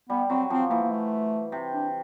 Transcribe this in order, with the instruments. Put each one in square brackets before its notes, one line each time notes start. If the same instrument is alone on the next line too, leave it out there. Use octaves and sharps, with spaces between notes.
[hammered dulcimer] G3 [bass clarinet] B3
[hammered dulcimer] F#3 [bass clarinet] C4
[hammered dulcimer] F3 [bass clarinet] C4
[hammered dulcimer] E3 [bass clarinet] A#3
[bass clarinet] A#3
A3
[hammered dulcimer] C3
[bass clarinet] D4